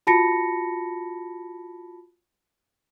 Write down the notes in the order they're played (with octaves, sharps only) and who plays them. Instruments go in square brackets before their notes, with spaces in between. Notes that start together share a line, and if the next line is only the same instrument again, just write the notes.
[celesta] F4 F#4 A5 B5 A#6 C#7